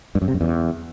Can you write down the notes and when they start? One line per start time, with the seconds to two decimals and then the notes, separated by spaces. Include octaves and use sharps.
0.15 G2
0.22 F#2
0.28 C3
0.34 F#2
0.41 E2